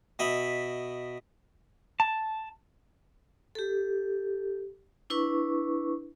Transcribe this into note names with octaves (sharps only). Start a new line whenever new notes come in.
B2 D#5 E5 B5
A5
G4 A4
D4 E4 B4 C#6